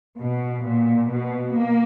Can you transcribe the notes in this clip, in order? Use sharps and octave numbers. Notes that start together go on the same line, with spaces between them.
B2
A#2
B2
A#3